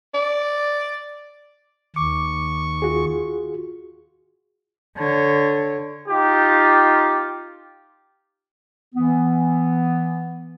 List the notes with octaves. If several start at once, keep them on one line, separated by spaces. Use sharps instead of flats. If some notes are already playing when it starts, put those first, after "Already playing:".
D5
D#2 C#6 D6
F4 F#4 G#4
D3 C#5
D#4 F4 G4
E3 B3